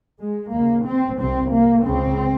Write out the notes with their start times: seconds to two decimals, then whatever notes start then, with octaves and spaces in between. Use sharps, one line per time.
0.21 G#3
0.53 D#2 C#3 A#3
0.86 C4
1.19 C2 C3 C4
1.52 A#3
1.85 C#2 C#3 C4